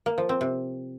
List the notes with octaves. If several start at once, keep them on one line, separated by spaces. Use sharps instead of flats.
A#3
F3
C4
C3